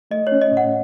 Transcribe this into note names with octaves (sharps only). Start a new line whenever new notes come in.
A3 D#5
C#5
C#4
D#5
A2
F#5